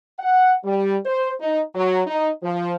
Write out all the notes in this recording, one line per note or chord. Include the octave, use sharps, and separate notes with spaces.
F#5
G3
C5
D#4
F#3
D#4
F3